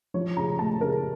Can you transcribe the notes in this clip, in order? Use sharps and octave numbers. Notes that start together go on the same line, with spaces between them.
F3 C#5
C#3 A#5
A3 A5
C#3 A#4